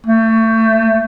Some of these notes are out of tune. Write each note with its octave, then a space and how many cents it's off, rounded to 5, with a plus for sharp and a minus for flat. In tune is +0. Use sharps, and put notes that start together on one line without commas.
A3 +25